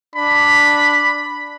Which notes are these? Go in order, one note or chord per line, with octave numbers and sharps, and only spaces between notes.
D4 B5